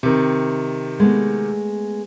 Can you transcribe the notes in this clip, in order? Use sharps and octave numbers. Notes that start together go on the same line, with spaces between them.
C3 D#3
G#3 A3 B3